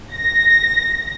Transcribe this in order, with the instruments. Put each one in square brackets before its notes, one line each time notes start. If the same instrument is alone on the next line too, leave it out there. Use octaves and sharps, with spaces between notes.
[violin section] A#6